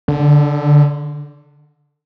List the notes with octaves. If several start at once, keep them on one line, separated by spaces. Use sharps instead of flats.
D3